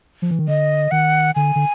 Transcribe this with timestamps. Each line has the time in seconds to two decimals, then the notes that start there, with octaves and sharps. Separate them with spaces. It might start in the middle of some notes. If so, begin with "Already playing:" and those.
0.22 F3
0.31 E3
0.39 D#3
0.48 D3 D#5
0.91 D#3 F#5
1.35 D3 G#5
1.56 D3